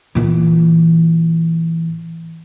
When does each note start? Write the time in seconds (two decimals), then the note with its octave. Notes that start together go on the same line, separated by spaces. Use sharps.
0.15 A#2 E3